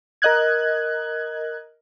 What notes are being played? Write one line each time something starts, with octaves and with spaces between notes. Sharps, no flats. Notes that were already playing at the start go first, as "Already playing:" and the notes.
A#4 D#5 F#6 G#6